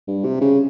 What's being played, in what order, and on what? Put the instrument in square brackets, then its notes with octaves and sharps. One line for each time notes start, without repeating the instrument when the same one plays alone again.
[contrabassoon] G2
C3
C#3